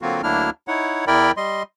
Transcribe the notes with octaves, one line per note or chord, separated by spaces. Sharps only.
D3 F#3 A#3 C4 F4 F#4
D2 F#3 A#3 D4 E4 F6
D#4 E4 C#5 F#5
E2 E4 A#4 D5 G5 B5
G3 D#5 C6